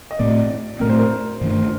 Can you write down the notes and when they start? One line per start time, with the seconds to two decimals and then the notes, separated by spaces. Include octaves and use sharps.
0.11 D#5
0.19 A2 A3 C4 D5
0.80 A2 A3 C4 A#4
0.90 C5
0.99 A#4
1.41 G2 D#3 A3 D4